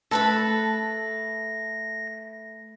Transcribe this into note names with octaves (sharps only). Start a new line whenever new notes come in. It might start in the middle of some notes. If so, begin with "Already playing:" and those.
A3 A4 B4 A5 B5 A#6